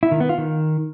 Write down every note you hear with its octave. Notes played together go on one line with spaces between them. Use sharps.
E4
D#3
B3
F4
D#3